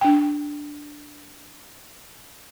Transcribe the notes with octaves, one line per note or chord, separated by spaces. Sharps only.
D4 G5